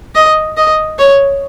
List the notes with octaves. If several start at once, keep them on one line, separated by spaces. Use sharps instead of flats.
D#5
D#5
C#5